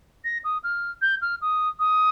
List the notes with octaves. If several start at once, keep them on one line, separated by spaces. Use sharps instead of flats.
A#6
D#6
F6
G6
F6
D#6
D#6